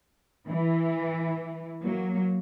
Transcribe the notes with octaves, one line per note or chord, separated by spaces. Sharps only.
E3
F#3 A#3